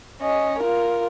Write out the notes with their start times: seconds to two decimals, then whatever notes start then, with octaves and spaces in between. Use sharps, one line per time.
0.21 C#4 D#5
0.60 F4 A#4